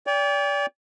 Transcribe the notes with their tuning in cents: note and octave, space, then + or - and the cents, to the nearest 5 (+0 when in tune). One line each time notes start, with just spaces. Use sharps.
D5 -35 G5 +30